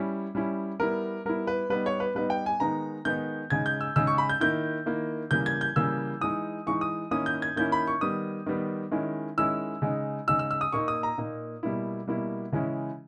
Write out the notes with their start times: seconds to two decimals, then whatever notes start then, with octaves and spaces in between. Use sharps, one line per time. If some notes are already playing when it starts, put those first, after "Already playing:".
Already playing: G3 C#4 E4
0.35 G3 C#4 E4
0.80 G3 B3 E4 A#4
1.25 G3 B3 E4 A#4
1.47 B4
1.70 G3 B3 D#4 B4
1.86 C#5
2.00 B4
2.15 G3 B3 D#4 B4
2.30 G5
2.46 G#5
2.60 D#3 G#3 B3 D#4 A#5
3.05 D#3 G#3 B3 D#4 G6
3.50 C#3 G#3 D#4 G#6
3.66 G6
3.81 E6
3.96 C#3 G#3 D#4 E6
4.07 C#6
4.18 B5
4.29 G6
4.40 D#3 A#3 E4 G6
4.86 D#3 A#3 E4
5.31 C#3 E3 G3 A#3 G6
5.46 G#6
5.61 G6
5.76 C#3 E3 G3 A#3 E6
6.21 E3 G#3 D#4 D#6
6.67 E3 G#3 D#4 C#6
6.81 D#6
7.11 D#3 A#3 C#4 E4 D#6
7.26 G6
7.42 G#6
7.56 D#3 A#3 C#4 E4 G6
7.72 B5
7.87 C#6
8.01 D#3 G3 B3 D#6
8.46 D#3 G3 B3
8.92 D#3 G#3 C#4 E4
9.38 D#3 G#3 C#4 E4 E6
9.82 C#3 G#3 D#4
10.27 C#3 G#3 D#4 E6
10.39 E6
10.51 E6
10.61 D#6
10.72 A#2 A#3 D#4 C#6
10.88 D#6
11.03 A#5
11.18 A#2 A#3 D#4
11.63 B2 G3 A#3 E4
12.08 B2 G3 A#3 E4
12.52 C#3 E3 G#3 C#4 E4